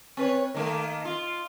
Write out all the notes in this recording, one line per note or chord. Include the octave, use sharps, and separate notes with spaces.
C4 B4 C#5
D#3 A3 A#3
F4